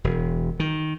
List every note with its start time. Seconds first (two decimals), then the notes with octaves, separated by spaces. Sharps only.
0.04 E1
0.60 D#3